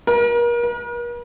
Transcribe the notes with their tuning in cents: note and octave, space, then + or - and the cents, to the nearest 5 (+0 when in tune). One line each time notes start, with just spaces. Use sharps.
A#4 +35
A#4 +45